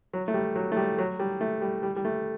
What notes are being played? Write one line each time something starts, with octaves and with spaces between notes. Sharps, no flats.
F#3
A3
G3
F#3
A3
G3
F#3
G3
A3
G3
G3
G3
A3